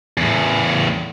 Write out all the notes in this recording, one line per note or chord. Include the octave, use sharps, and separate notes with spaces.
E2 A2